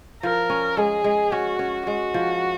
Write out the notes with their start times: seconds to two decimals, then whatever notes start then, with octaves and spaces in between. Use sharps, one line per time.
0.23 F3 A#4
0.50 C#4
0.77 G#3 G#4
1.04 G#3
1.32 C#4 F#4
1.59 C#4
1.87 G#3 F#4
2.14 F3